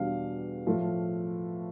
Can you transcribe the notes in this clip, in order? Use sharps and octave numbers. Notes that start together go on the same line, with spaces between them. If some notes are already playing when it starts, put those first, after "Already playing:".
Already playing: E2 B2 G3 D4 F5
A2 F3 A3